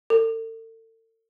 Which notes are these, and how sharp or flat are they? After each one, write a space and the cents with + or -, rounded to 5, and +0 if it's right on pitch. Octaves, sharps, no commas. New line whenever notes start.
A4 +40